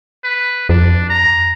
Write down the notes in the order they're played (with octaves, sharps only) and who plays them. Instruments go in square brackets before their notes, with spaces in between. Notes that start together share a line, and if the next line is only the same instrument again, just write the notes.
[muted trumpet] B4
[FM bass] F2 [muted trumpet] D4
[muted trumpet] A#5